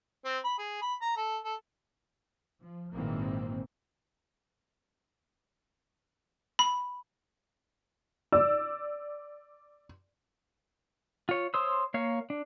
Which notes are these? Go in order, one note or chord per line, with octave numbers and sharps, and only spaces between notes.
C4
B5
G#4
B5
A#5
A4
A4
F3
G#1 A#2 D#3 E3 A#3 C4
B5
D5 E6
F4 C#5
C5 C#5 C6 D#6 E6
A#3 C#5 F5
D4